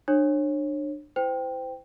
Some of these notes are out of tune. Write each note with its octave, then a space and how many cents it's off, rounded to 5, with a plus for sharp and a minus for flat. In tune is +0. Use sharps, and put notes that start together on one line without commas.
D4 +30 C#5 -30
E4 +0 C5 -30 G5 +0